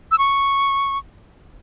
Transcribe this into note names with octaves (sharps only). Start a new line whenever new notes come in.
E6
C#6